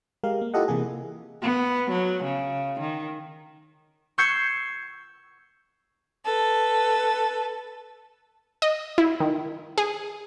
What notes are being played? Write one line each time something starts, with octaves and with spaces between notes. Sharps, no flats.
G#3 G4 A#4 F5
A#3
E4 F4 G4 A4 D#5 F#5
C3 E3 A#3 G#4
B3
F#3
C#3
D#3
C#6 E6 G6 G#6 C7 C#7
A4 B4
D#5
E4
D#3
G#4